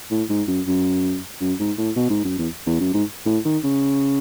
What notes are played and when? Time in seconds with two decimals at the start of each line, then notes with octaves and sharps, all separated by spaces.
0.10 A2
0.30 G#2
0.48 F#2
0.67 F#2
1.41 F#2
1.59 G#2
1.78 A2
1.96 B2
2.10 G#2
2.24 F#2
2.38 E2
2.66 E2
2.80 F#2
2.94 G#2
3.26 A2
3.45 D#3
3.64 C#3